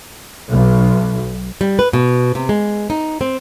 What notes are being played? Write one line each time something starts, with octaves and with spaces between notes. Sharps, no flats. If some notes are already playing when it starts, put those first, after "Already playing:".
B1
G3
B4
B2
C3
G#3
D#4
C4